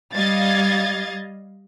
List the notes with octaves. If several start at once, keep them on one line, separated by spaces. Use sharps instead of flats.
G3 D#5 F5 G#6 A6